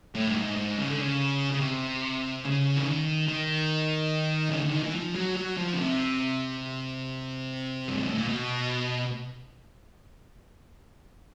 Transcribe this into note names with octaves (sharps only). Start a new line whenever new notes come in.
A2
G2
G#2
G#2
C#3
D3
C#3
C#3
C3
C#3
E3
D#3
D#3
C#3
D3
D#3
E3
F3
F#3
F#3
F3
C#3
C3
G2
G#2
A2
A#2
B2